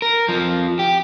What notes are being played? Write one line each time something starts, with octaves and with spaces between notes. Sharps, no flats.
A#4
F2 F3
G4